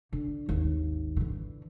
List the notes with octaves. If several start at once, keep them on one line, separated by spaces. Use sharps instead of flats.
D3
G#1 D#2
D3 E3